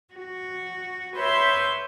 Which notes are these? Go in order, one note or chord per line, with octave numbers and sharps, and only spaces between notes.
F#4
B4 C#5 E5 C6 E6 G6